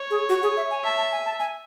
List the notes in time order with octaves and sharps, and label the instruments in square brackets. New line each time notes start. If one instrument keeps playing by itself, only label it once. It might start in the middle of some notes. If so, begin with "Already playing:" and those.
Already playing: [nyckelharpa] C#5
[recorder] G#4
F#4
G#4
E5
G#5
[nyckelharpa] E5 [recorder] A5
[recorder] A5
G#5
A5
G#5